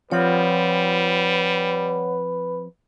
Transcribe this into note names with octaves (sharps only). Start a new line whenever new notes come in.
F3 G3 C4 F4 B4 C#5 F#5